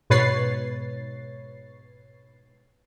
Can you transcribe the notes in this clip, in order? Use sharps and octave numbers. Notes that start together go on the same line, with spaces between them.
G#2 B2 B4 C#5 A6 C7